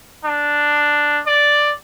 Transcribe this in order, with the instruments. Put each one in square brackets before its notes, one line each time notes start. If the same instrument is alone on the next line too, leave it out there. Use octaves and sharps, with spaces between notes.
[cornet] D4
D5